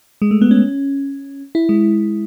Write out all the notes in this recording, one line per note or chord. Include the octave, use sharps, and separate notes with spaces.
G#3
A3
B3
C#4
E4
G#3